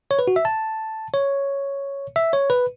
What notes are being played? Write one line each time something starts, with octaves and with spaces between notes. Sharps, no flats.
C#5
B4
F#4
E5
A5
C#5
E5
C#5
B4